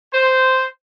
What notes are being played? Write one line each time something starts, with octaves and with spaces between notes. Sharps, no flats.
C5